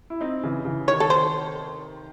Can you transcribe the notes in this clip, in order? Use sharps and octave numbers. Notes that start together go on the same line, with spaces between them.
E4
C4 D#4
C#3 E3
C#3 E3
C3 D#3 C#5
A4
C5